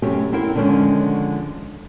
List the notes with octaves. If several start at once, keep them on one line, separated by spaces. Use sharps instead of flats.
F#2 C3 A3 C4 C#4 G4
C4 E4 A#4 G5
D3 D#3 F3 G#3 C#4